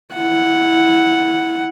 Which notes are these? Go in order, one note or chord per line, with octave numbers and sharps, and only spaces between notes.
E4 F#5